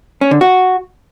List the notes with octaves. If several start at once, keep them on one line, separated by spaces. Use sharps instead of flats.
C#4
D3
F#4